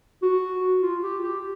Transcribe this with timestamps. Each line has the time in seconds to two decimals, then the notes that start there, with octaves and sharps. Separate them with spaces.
0.23 F#4
0.82 F4
1.03 G4
1.23 G4